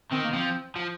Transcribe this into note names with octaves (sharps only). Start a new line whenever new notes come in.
D#3 C4
A#3
F3 C4
F3